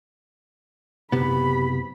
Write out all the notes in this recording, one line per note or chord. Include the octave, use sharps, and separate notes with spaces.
F#1 C3 B3 G4 B5